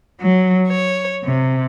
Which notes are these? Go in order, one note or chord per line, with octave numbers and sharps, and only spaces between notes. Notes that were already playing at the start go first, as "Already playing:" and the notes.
F#3
C#5
C3